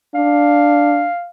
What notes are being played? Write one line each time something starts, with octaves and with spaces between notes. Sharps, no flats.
D4 F5